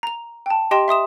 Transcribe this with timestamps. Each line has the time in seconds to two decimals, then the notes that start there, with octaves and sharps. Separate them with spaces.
0.03 A#5 F7
0.46 G5 A5
0.71 G4 D#5 G5 C6 E7
0.88 E5 C6 D#6 E7